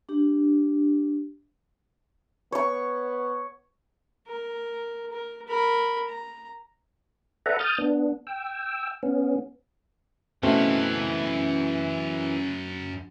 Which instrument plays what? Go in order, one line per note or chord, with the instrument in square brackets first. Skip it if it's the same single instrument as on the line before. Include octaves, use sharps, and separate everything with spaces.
[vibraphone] D4 G4
[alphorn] B3 [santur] C#5 C#6
[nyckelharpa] A#4
A#4
A#4 B5
A#5
[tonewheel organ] A4 B4 D5 E5 F#5 A#5
D#6 F6 G6 A6
B3 D4
G5 E6
B3 C#4
[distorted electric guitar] F#2 F5 [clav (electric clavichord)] B2 A3 C4 [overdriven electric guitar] E3 [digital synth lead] C#4